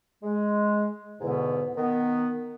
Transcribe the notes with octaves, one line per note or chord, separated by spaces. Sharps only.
G#3
E2 G#2 B2 D3 B3
D#3 B3